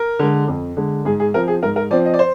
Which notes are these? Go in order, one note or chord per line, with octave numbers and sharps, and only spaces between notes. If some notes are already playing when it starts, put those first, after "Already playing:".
Already playing: A#4
D3 G#3
F2
D3 G#3
G#2 G#4
G#4
F3 C4 A#4
G#4
G#2 A#4
A#4
F3 C4 D5
D#5
D5
C5